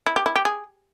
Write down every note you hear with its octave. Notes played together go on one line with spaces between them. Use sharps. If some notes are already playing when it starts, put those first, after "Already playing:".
E4
G4
E4
G4
G#4